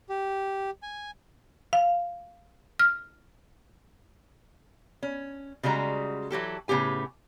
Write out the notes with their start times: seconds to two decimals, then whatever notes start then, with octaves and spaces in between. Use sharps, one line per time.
0.09 G4
0.82 G#5
1.73 F5
2.79 F6
5.03 C#4
5.63 C#3 G3 G#3 F#4 A#5
6.30 E3 F#3 G4 A4
6.68 A2 C#3 B3 G4 G#5